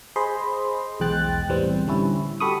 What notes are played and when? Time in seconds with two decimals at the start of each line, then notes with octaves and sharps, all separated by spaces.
0.16 G#4 C5 D#5 B5 C6
1.00 B1 E2 G#3 G5 F#6 A6
1.49 A2 E3 G3 B3 C4
1.87 D3 G3 C#4 E4
2.40 F#4 G4 A4 B5 C#6 D#6